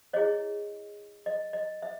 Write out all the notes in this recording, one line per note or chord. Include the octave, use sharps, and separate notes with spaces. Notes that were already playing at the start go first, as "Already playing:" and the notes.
E4 G#4 C#5 D#5
D#5
D#5
E5